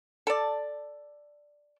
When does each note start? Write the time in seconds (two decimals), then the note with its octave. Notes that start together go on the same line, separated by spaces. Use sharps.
0.27 A4 D5